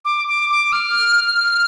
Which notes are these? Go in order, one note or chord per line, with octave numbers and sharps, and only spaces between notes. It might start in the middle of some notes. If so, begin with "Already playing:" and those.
D6
D6
D6
F6